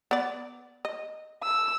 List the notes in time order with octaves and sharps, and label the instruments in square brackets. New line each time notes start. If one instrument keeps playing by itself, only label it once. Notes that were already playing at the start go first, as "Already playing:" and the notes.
[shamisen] B3 D5
D#5
[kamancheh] E6